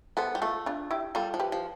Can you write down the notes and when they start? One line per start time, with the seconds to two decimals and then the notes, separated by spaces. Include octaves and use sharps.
0.17 B3 A4 C5
0.35 G3
0.42 A3 F4 A4
0.66 D4 F4
0.91 E4 G4
1.15 G3 F4 A4
1.34 F3
1.40 G4 B4
1.52 F3